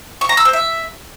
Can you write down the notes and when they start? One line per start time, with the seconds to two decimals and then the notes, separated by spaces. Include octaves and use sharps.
0.21 C#6
0.29 A#5
0.37 E6
0.45 C5
0.53 E5